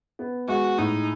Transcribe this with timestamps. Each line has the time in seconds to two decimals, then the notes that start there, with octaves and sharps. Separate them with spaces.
0.19 B3
0.48 G#3 F#4
0.78 A2 D#4